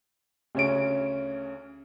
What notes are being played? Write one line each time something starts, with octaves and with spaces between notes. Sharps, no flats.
D2 C#3 C#4 C#5 D7